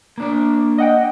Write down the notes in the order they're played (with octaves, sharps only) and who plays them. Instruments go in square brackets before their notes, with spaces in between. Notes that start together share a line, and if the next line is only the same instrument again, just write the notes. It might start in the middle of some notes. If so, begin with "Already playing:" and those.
[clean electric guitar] A#3 D4 D5
[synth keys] D#5 F#5 G5